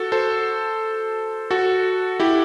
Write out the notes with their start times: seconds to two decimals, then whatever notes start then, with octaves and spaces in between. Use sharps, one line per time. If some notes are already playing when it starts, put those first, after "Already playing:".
Already playing: F#4 A4
0.12 A4 C5
1.51 F#4 A4
2.20 E4 G4